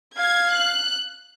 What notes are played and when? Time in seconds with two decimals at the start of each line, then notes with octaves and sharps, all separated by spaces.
0.17 F5 G#6
0.54 F#6